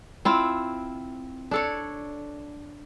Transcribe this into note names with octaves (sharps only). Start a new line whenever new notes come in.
C4 E4 F4
D4 A4 C#5